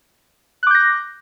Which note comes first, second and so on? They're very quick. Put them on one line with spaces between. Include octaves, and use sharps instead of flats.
F#6 D6 G6 A#6